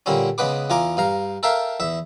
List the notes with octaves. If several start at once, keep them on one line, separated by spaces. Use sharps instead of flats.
A#2 D3 G3 C4 C#4
C#3 G#3 B3 B4 D6
E2 F4 G#5 A#5 D6
G2 F5 A#5
A4 A#4 E5 F5 G5
E2 E5